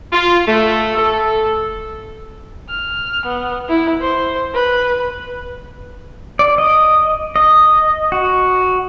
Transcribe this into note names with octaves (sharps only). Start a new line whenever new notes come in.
F4
A3
A4
F6
B3
E4
C5
B4
D5
D#5
D#5
F#4